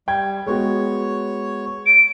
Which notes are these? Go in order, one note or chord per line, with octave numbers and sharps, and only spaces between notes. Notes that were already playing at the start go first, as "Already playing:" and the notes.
G3 G5 G#6
G#3 B3 F#4 C#5
D7